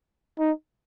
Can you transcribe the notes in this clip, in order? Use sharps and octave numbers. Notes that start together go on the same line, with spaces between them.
D#4